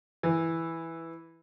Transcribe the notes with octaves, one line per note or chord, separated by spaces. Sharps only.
E3